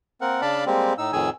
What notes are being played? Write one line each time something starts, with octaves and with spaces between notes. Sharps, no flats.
A#3 C4 A#4 F#5
C#3 D4 D5 F5 A5 B5
G3 G#3 A#3 C4 G4
A2 D#4 E6
F2 A2 D#3 G#4 G#5 E6